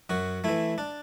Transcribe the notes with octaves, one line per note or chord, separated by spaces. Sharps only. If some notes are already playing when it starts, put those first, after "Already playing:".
F#2 F#4
E3 A3 E4
D4